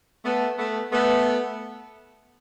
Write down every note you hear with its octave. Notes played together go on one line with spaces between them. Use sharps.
A3 B3
A3 B3
A3 B3